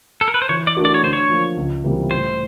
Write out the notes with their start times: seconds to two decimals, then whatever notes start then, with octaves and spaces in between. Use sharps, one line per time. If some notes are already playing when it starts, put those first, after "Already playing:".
0.21 A4
0.28 A#4
0.34 B4
0.42 C5
0.49 E3 C#5
0.67 D5
0.76 A3 D4 F#4 A#4
0.85 D5
0.94 C#5
1.03 D3 C5
1.13 C#5
1.29 F3 A#3
1.57 C#2
1.84 C3 E3 G3 A#3
2.11 A2 C5